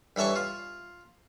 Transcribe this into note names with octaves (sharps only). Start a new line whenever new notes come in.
G2 E3 A4 C#5 C#6
F4